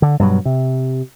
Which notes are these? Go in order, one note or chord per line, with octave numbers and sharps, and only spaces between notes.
D3
G2 B2 F#3
C3